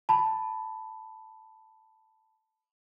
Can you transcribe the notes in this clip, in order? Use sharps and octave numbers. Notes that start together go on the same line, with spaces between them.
A5 B5